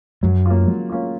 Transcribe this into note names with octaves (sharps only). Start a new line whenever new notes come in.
F#2 F#3
A#3 C#4 F4
F#3
A#3 C#4 F4